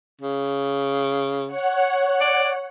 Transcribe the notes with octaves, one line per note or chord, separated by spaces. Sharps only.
C#3
C#5 F#5
D5